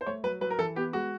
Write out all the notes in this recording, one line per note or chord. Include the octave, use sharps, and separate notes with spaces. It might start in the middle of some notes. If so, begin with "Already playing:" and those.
C5
A3 C#5
F#3 B4
F#3 B4
A#4
E3 A4
B3 G4
G#3 F#4